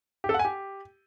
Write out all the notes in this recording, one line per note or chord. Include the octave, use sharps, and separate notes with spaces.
G4
A4
F#5
G#5
G4